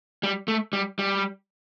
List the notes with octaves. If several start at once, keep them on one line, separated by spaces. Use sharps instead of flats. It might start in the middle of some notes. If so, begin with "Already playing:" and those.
G3
A3
G3
G3